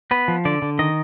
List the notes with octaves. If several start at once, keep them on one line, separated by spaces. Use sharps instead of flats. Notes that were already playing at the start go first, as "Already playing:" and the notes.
B3 B4
F3
D3 D5
D3
D#3 D#5